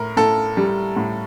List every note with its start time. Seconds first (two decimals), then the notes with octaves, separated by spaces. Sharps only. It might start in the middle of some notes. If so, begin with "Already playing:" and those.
Already playing: A2 A#4
0.17 A2 A4
0.57 G3
0.96 A2